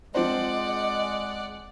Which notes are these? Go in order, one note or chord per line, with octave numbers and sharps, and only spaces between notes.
F3 G#3 C4 C5 D5 D#5 F#5